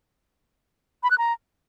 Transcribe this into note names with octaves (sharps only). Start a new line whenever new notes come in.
B5
F#6
A#5